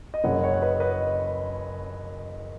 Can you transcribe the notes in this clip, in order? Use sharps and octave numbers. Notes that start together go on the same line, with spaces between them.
D#5
F#1 F#2 C#3 F#3 C#5 F#5
C#5 F#5
F#5
B4 D#5
B4 D#5